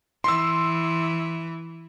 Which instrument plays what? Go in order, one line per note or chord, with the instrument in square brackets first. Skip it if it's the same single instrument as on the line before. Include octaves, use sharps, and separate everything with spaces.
[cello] E3 [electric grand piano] C6 E6